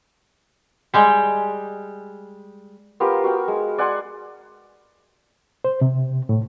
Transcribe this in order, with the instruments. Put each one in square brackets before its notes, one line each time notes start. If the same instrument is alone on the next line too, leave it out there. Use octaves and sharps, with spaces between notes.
[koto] G3 G#3 G4
[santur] B3 F4 G4 A#4
F#4 F5 G5
G#3
D5 F#5 G#5 C6
[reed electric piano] C5
C3
A2